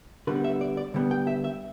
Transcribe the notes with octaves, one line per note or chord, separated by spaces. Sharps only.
D3 G3 B3 B4
E5
D5
D5
D3 G3 B3
G5
E5
E5